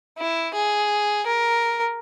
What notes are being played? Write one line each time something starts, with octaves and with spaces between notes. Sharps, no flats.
E4
G#4
A#4